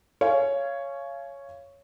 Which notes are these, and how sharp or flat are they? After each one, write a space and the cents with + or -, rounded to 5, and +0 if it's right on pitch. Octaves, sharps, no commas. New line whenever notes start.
C#5 +5 F5 -25 G#5 +25